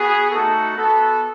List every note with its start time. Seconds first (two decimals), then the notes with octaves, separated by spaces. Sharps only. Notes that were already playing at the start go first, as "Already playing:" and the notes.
Already playing: B3 F#4 G#4
0.31 A3 D#4 F#4 A4
0.76 B3 F#4 A4